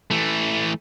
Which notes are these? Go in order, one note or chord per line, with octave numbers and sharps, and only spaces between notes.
E3 A3